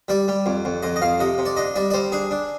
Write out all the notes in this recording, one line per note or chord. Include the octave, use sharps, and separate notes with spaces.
G3 D5
G3
F2
F2
F2 D#5
D#5
F2 F5
C3 D#5
C3
D5
D4 D#5
G3 D5
D5
G3 C5
D4 G#4
D4